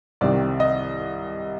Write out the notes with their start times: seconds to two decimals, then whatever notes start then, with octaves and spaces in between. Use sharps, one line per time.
0.21 C2 C3 D#3 D5
0.60 D#5